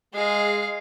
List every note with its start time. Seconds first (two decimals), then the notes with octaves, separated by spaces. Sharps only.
0.14 G#3 G#4 F5